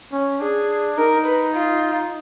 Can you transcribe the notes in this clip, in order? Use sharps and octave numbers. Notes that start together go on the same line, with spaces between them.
C#4
D4 G#4
D#4 A#4
B4
F4